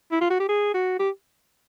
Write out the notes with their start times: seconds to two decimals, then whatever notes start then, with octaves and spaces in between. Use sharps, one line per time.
0.12 E4
0.21 F4
0.30 F#4
0.40 G4
0.49 G#4
0.74 F#4
0.99 G4